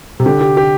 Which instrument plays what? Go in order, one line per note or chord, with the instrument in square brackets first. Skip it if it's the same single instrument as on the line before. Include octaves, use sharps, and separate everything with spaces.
[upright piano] C3
[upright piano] D3 [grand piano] G4
[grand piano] G4
G4